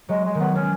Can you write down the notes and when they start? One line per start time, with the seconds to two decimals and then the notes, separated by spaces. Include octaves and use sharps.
0.09 F#3 G#3
0.24 G#3
0.35 D#3
0.40 F#3 B3
0.55 G#3 C#4